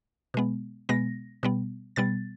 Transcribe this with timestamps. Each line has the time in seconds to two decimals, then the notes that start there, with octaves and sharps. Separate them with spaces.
0.34 B2 G#3 B3
0.89 B2 G#3 B3 A#6
1.43 B2 G3 B3
1.96 B2 G3 B3 A6